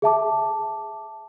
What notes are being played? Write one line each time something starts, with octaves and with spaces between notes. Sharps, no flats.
G#4 E5 A5 D6